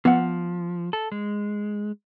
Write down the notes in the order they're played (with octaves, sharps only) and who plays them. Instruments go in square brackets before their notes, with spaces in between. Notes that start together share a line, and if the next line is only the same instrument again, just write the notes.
[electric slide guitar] F3 [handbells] B3 F#5
[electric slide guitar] A4
G#3